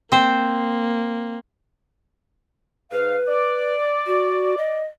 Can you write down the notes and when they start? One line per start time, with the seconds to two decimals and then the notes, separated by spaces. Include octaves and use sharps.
0.12 A#3 C4 C5
2.92 G#2 D#4 B4 F5
3.28 D5
4.06 F#4
4.58 D#5